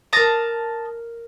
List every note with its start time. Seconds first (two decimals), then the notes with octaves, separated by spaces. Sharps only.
0.13 A#4 A5 A#5 D#6 C7